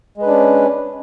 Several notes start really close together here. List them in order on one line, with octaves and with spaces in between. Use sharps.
G#3 B4 D4 C#4